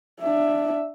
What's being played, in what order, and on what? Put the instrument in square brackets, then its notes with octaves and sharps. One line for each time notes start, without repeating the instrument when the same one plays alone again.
[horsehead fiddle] D4 E5